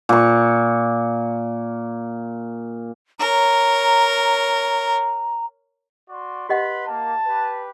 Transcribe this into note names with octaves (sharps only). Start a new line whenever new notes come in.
A#2 C#6
A#4 C#5 A#5
F#4 D5 C6
G4 B4 D#5 F#5 B5 C6
A#3 A5
G4 B4